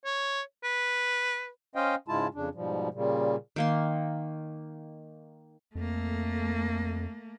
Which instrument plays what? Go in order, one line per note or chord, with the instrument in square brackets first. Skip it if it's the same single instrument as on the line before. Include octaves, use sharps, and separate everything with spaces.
[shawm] C#5
B4
[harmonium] C#4 C5 D#5 F5 G5
G#2 C#3 G#3 E4 F4 A5
F2 C#3 D4
G#2 B2 F3 G3
A#2 C#3 G3
[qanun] D#3 A#3 C6
[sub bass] F2 [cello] A3 A#3